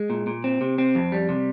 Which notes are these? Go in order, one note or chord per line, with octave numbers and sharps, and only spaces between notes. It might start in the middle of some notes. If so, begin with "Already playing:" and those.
Already playing: G#3
A#2
A#2
C4
C3
C4
F2
G3
C3